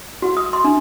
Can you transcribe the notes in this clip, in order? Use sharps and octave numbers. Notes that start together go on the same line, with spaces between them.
F#4
D#6
C6
D4